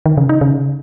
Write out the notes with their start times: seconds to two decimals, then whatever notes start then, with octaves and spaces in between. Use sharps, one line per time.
0.06 D#3
0.17 C#3
0.29 D#4
0.41 C#3